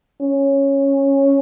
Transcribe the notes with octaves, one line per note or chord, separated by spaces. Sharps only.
C#4